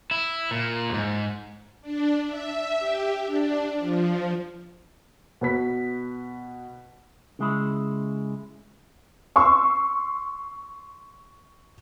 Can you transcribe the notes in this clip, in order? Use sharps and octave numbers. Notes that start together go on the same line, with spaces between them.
E4
A#2
D#2 G#2
D4
E5
G4
D4
F3
B2 B4 B6
C#3 G#3 E4
C6 C#6 E6